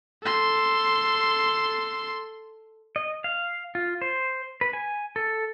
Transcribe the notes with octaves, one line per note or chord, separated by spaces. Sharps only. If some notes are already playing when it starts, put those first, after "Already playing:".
A4 C6
D#5
F5
F4
C5
B4
G#5
A4